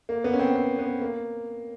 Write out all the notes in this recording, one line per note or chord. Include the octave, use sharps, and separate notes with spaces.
A#3
B3
C#4
C4
C4
B3
A#3